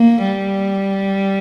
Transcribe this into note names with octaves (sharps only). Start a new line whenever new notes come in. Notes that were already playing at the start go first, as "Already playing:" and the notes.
Already playing: A#3
G3